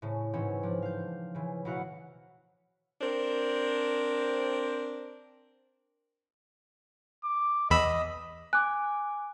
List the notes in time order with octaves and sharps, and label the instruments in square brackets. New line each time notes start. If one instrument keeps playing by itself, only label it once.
[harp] A2 C#3
G#2 B2 E3 C4 C#4
F3 D4
F5 G6
C#3 E3
A1 B2 E4 F#4 F5 F#5
[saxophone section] C4 D4 A#4 C5
[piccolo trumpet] D6
[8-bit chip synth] E2 B5 E6 [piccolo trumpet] D#5
[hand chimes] G#5 D6 [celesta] F#6